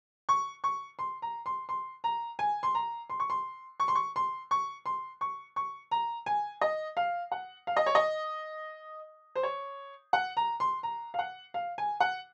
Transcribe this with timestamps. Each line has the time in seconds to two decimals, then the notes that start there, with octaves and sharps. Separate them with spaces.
0.29 C#6
0.64 C#6
0.99 C6
1.22 A#5
1.46 C6
1.69 C6
2.04 A#5
2.39 G#5
2.63 C6
2.75 A#5
3.10 C6
3.20 C#6
3.30 C6
3.80 C#6
3.88 C6
3.95 C#6
4.16 C6
4.51 C#6
4.86 C6
5.21 C#6
5.56 C#6
5.91 A#5
6.26 G#5
6.61 D#5
6.97 F5
7.32 F#5
7.67 F5
7.77 D#5
7.86 C#5
7.95 D#5
9.35 C5
9.43 C#5
10.13 F#5
10.37 A#5
10.60 C6
10.83 A#5
11.14 F5
11.19 F#5
11.54 F5
11.78 G#5
12.00 F#5